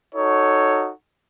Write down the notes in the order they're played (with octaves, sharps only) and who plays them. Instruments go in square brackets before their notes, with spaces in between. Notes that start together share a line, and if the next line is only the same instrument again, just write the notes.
[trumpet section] D#4 F#4 A4 C#5